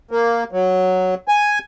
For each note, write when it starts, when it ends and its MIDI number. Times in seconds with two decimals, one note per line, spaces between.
0.11 0.44 58
0.52 1.15 54
1.28 1.59 80